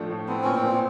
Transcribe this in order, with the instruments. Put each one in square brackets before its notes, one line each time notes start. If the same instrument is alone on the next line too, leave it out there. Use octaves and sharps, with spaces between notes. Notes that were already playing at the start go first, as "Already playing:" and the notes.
Already playing: [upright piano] A2 F3 A3 D4
A2
[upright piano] B3 [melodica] C4
[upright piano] A#2 [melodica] C#4
[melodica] C4
[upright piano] A#2